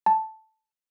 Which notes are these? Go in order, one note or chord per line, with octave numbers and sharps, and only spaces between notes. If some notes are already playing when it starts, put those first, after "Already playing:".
A5